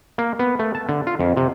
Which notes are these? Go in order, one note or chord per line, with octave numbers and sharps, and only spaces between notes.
A#3
B3
A3
A5
D3
F4
F2
C3